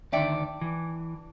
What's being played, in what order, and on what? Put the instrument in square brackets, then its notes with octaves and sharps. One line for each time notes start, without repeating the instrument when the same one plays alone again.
[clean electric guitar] D2 D#3 D5 [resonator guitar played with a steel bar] D4 E5 G5
[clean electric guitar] E3